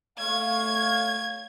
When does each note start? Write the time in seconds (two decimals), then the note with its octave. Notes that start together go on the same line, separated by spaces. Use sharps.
0.18 A3 C#5 F5 G#6